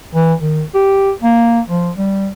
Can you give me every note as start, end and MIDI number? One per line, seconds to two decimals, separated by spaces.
0.15 0.34 52
0.41 0.63 51
0.75 1.11 67
1.22 1.60 58
1.69 1.90 53
1.96 2.28 55